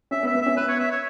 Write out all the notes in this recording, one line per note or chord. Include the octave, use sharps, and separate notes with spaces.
C#4 E5
B3
E5
B3
C#4 E5
B3 B4
C#5
E5
C#5